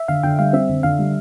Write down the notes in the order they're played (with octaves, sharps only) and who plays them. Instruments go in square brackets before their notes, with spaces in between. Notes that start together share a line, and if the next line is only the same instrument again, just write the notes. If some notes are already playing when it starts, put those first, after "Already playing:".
Already playing: [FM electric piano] E5
[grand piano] D3 [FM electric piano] F5
[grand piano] D3 [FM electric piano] G5
[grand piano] G3 [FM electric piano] F5
[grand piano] C4 [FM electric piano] E5
[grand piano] D3
[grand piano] D3 [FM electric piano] F5
[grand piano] G3